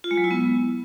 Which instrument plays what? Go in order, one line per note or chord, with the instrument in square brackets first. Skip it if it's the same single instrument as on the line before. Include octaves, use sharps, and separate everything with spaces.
[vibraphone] F4
G#3
F#3
E4
B3